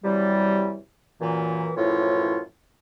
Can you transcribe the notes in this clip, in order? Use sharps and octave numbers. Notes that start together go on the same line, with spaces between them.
C3 E3 F#3 G3
F#2 A#2 E3
F#2 A2 E3 F3 F4 C#5